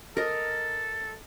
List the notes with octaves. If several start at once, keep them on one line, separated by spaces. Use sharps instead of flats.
A4 A#4 D#5